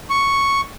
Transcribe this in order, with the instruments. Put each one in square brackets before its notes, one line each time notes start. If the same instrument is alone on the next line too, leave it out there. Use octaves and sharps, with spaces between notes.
[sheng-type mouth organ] C#6